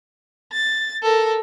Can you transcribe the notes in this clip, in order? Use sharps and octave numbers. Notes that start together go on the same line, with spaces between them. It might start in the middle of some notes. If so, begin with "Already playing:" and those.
A6
A4 A#4